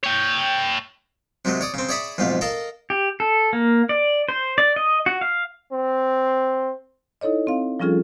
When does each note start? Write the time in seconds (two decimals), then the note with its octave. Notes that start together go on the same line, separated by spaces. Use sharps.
0.04 C#5 G5
1.45 C3 F#3 G#3 A3
1.61 C#5 D5 D#6
1.74 C#3 C4
1.89 G#4 C#5 D5 E5 B5 D#6
2.18 B1 F2 G#2 A3 F5
2.41 A4 A#4 D#5 F5 A5
2.90 G4
3.20 A4
3.53 A#3
3.89 D5
4.29 C5
4.58 D5
4.76 D#5
5.06 F#4
5.21 F5
5.72 C4
7.21 D#4 E4 A4 C#5 D#5
7.47 C4 F5
7.80 F3 G3 C#4 F4 G#4 A4